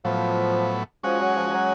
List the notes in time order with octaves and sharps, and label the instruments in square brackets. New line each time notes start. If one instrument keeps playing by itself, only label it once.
[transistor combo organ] A2 F#3 B3 [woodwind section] F3
[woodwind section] F3 [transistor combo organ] G#3 C#4 F#4
[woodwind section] F#3
F3
F3
F#3